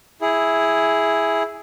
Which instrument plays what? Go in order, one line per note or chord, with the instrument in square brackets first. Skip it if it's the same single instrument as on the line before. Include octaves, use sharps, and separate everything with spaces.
[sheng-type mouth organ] E4 G#4